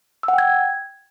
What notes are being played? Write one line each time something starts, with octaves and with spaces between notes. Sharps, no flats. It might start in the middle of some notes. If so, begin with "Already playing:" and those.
E6
F#5
G5
G#6